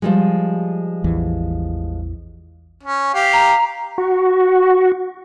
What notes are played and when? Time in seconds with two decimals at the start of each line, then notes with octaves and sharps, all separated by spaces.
0.02 F3 G3 G#3
1.04 A1 E2 E3
2.83 C#4
3.14 G4 F5
3.33 A#5
3.98 F#4